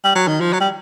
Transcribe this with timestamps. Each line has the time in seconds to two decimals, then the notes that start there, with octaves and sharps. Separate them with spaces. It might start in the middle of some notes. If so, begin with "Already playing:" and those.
0.04 G3
0.15 F#3
0.28 D#3
0.41 F3
0.53 F#3
0.61 G3